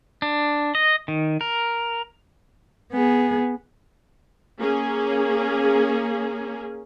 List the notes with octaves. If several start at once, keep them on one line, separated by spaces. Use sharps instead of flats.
D4
D#5
D#3
A#4
B3 G#4
A#3 C#4 G#4